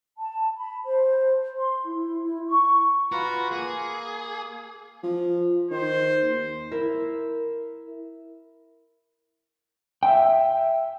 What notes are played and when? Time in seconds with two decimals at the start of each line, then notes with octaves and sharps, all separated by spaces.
0.18 A5
0.56 B5
0.85 C5
1.57 C6
1.85 E4
2.22 E4
2.47 C#6
3.12 F4 F#4 B4 A#5
3.51 A#3 G#4
5.04 F3
5.71 D#3 C5
6.22 D#2
6.71 E4 A#4 E5
10.03 E5 G5